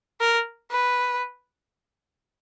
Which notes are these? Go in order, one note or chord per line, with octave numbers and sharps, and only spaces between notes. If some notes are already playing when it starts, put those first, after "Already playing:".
A#4
B4